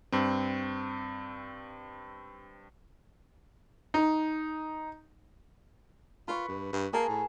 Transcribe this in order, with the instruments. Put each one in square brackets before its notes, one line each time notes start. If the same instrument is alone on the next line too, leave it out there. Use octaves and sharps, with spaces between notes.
[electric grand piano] G2 C4
[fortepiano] D#4
[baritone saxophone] F4 [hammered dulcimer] B4 C#6
[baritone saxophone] G2
G2
[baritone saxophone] A#3 [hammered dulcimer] G#4 A#4 A5
[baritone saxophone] A2